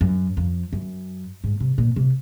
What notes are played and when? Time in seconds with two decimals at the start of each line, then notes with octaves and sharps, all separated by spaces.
0.01 F#2
0.37 F2
0.73 F#2
1.44 G#2
1.60 C3
1.78 A#2
1.96 C3